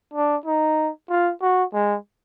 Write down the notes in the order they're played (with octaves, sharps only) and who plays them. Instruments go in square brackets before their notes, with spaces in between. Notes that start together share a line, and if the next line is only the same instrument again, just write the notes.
[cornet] D4
D#4
F4
F#4
G#3